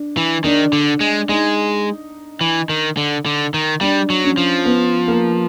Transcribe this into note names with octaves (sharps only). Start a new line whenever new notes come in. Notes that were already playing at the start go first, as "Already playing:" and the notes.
Already playing: D4
E3
D#3 D4
D3
G#3
G#3 D#4
E3
D#3
D3
D3
D#3
G3 D4
F#3
C#4
F3
B3
A#3